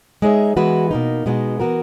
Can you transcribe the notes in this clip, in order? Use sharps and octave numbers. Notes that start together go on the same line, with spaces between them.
G#3 D#4 G#4 C#5 E5
E3 G#3 B3 F#4 B4
B2 A#3 D#4
B2 G#3 B3 D#4 F#4
E3 B3 F#4 A#4